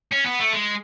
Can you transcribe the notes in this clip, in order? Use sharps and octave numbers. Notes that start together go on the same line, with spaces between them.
C#4
B3
A3
G#3